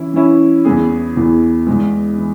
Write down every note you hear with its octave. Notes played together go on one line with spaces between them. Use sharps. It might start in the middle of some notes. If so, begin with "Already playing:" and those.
Already playing: E3 C#4 E4
E3 C#4 E4
E2 E3 B3 G#4
E2 E3 B3 G#4
E2 E3 G#3
E3